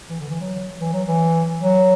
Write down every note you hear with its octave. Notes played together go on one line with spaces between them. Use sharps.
E3
D3
E3
F#3
E3
F#3
E3
F#3